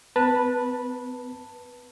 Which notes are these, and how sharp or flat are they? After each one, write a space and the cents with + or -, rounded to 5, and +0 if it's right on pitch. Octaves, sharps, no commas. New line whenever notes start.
B3 +45 B4 -15 A5 +10